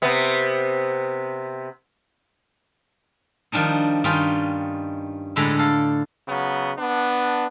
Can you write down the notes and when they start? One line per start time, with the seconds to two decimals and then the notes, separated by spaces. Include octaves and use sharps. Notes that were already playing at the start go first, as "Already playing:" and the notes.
0.02 C3 B3
3.52 D#3 F3 G3 D4 D#4
4.04 G2 D#3 G3 C#4 D#4 F4
5.36 A2 D3 G#3 A4 A#5 B5
5.59 A4 F5
6.28 C#3 F#3 B3
6.78 B3 D4